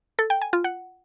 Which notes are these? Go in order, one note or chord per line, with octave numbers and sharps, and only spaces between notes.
A4
G5
G#5
F4
F#5